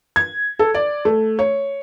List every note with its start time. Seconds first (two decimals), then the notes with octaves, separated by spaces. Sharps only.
0.16 G#6
0.59 A4
0.75 D5
1.05 A3
1.39 C#5